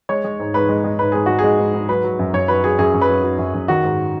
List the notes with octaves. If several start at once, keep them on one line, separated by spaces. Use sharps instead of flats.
G#3 C#5
G#3
G#2
G#2 B4
G#3
G#3
G#2 B4
G#2 G#4
G#3 F#4
G#4
G#3
G#2
G#2
F#3 B4
F#3
F#2
F#2 C#5
F#3 B4
F#3 G#4
F#2 G#4
F#2
B4
F#3
F#3
F#2
F#2
D#3 F#4
G#2